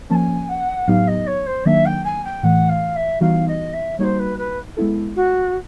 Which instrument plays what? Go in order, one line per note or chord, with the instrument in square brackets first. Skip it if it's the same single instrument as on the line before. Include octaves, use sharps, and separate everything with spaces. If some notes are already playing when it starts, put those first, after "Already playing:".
[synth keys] F3 A#3 C#4 [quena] G#5 A5
[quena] F#5
[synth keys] A2 F#3 B3 D#4 G4 [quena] F5
[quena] D#5
C#5
C5
[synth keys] D#3 F#3 A#3 D4 [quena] E5
[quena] G5
G#5
G5
[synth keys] A2 E3 A3 [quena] F#5
[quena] F5
E5
[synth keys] E3 G3 B3 D#4 F#4 [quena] F5
[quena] D#5
E5
[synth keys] G3 A#3 D#4 F#4 [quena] C5 C#5
[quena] B4
B4
[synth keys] G#3 B3 E4 A4
[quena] F#4